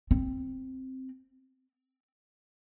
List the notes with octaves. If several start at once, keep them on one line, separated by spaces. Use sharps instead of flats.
C4